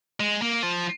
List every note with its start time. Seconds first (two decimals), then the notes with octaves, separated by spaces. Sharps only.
0.20 G#3
0.42 A#3
0.63 F3